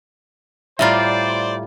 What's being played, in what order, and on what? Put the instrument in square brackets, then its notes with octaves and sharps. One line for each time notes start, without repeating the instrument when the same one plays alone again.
[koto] A2 G3 F4 [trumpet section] C5 D5 [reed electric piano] E5 A#5